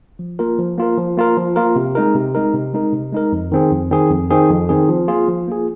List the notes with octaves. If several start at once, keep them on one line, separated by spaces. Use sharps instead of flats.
F3
A#3 F4 A#4
F3
A#3 F4 A#4
F3
A#3 F4 A#4
F3
A#3 F4 A#4
C3
G#3 D#4 A#4
C3
G#3 D#4 A#4
C3
G#3 D#4 A#4
C3
G#3 D#4 A#4
F2
D#3 C4 G#4
F2
D#3 C4 G#4
F2
D#3 C4 G#4
F2
D#3 C4 G#4
F3
A#3 F4 G#4
F3
A#3 F4 G#4